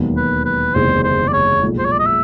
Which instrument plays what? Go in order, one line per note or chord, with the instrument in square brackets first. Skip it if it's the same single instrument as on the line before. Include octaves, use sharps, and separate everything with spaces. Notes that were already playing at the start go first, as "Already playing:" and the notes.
Already playing: [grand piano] E1 D#2 D#3 F#3 B3
[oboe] B4
B4
[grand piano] F#1 E2 C3 D#3 G#3 [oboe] C5
[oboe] C5
D5
C#5
[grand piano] B1 A#2 F3 G#3
[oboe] C5
C#5
D5
D#5
E5